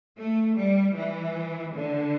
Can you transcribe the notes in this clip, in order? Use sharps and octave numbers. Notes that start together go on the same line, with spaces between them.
A3
G3
E3
D3